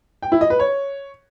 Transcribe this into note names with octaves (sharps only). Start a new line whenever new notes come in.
G5
E4
D#5
B4
C#5